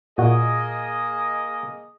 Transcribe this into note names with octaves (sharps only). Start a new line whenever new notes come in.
A#2 A#3 F#4 G#4 D#5